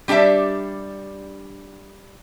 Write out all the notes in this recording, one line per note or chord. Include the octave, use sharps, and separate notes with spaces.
G3 D4 G4 D5 E5